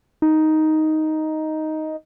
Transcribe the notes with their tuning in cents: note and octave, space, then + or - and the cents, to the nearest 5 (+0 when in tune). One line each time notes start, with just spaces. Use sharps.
D#4 +5